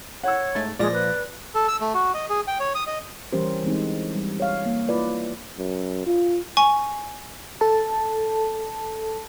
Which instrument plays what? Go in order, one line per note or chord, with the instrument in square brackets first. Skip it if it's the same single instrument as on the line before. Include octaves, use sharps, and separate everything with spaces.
[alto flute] C#5 [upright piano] F#5 E6
[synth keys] G#2 A3 [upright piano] A6
[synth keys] A#2 F3 A#6 [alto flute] G#3 [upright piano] D5
[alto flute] B4
[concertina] A4
E6
A3
F#4
D#5
G#4
G5
C#5
D#6
D#5
[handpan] E3 G3 C#4 G4 A#4 C5
E3 G#3 C4 D#4
G3
C#5 F5
A#3
E4 F4 B4 D5
[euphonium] F#2
F4
[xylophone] G#5 C#6
[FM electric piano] A4 A5